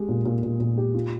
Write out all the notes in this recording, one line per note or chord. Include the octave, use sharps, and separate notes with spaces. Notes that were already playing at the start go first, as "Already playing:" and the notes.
Already playing: G#3 G4
A#2
A#2
A#2
A#2
G4
F4